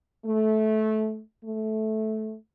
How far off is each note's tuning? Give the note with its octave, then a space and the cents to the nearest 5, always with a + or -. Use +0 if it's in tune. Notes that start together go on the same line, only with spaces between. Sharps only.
A3 -20
A3 -15